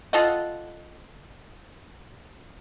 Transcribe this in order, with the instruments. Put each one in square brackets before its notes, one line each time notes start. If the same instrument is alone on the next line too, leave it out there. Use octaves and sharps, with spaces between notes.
[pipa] F4 A4 D#5 F#5